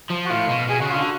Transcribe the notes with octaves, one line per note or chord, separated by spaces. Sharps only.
F3
F#4
A2 F4
B2
B2 G#4
C#3 F#4
D3 F4
F#4